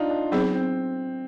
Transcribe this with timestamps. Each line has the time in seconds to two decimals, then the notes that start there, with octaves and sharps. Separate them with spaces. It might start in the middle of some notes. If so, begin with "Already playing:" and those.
Already playing: D4 D#4 F4
0.10 D4
0.32 F#3 B3 C4 D#4 G#4
0.52 C4